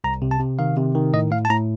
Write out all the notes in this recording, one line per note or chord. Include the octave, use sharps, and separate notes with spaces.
C2 A#5
C3
A5
C3
D#3 F5
C3
D#3
A2 D#5
A2 F5
A5
A2 A#5